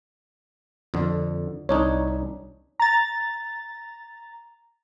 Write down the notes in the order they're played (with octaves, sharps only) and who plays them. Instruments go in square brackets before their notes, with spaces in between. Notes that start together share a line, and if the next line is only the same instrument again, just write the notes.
[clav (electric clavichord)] F2 D3
[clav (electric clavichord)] C2 D4 D#4 [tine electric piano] C#5
[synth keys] A#5 A6